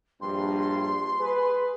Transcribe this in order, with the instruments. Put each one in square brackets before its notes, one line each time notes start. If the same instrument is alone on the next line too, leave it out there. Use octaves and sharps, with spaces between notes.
[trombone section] A#1 G2 [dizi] C6
[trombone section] G#4 B4